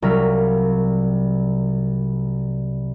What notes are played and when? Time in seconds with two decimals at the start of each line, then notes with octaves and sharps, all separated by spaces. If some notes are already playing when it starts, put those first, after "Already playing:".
0.02 C2 F#3 A#4 F5 B6